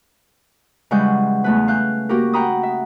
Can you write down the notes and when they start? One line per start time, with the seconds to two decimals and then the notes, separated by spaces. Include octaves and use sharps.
0.91 C#3 E3 G3 G#3 F#5 G6
1.44 E2 A3 B4
1.68 F5 F#6 G6
2.09 A#3 F#4 G4 A#4
2.33 F#5 G5 A#5 B5 D#6
2.63 E5